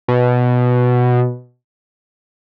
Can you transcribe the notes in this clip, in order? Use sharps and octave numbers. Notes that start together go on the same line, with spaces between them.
B2